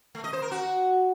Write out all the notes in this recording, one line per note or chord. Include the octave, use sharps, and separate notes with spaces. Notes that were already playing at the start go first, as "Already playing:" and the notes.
A3
D#5
C5
A#4
F#4